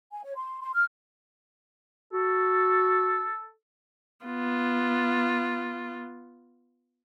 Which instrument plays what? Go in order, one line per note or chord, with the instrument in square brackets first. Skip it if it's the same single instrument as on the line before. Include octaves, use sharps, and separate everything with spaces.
[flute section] G#5
C#5
C6
C6
F6
[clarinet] F#4 [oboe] A4
[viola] B3 F4